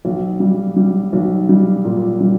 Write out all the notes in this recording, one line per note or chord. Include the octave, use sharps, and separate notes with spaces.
B1
G3
G3
B1
G3
A#2
G3